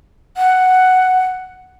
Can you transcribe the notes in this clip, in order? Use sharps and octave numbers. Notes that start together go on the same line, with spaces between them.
F#5